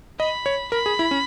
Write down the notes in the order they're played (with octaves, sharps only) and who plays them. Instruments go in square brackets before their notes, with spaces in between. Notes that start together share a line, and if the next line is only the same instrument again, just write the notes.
[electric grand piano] D#5 [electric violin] B5
[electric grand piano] C#5
[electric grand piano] A#4 [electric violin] B5
[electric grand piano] G#4
E4
C#4